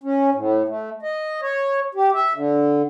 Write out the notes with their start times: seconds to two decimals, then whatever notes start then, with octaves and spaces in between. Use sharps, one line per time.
0.04 C#4
0.34 A2
0.68 A3
1.02 D#5
1.42 C#5
1.95 G4
2.14 E5
2.34 D3